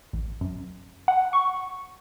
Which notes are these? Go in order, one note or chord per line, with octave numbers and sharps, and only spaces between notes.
A1
F#2
F#5
C#6